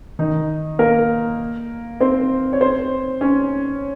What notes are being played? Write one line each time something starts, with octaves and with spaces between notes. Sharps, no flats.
D#3 D#4
A#3 A#4
C4 C5
C#5
C4 C5
C#4 C#5